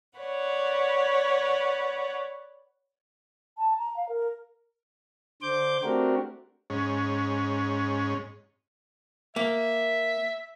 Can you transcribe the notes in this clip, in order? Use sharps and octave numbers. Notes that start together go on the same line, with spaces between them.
B4 C#5 D5 F#5
A5
A#5
F5
A#4
D3 C5 D6 G6
A3 C4 D4 F#4 G4 A#4
G#2 C#4
A#3 E5